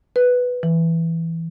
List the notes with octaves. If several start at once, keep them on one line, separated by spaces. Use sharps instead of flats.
B4
E3